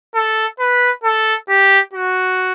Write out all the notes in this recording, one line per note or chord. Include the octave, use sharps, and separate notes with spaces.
A4
B4
A4
G4
F#4